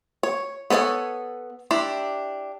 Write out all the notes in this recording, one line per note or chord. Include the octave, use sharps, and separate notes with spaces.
C#5
B3 A4 C#5 D5 G#5
D4 E4 G4